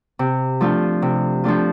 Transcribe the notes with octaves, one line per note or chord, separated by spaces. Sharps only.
C3
F3 A3 D4 F4
C3
F3 A3 D4 F4